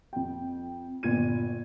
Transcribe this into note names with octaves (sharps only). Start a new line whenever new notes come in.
F2 G5
G1 A#2 G#6 D#7